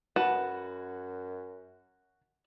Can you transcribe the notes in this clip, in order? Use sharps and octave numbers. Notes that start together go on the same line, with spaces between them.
F#2 F#4 B4 F#5 A5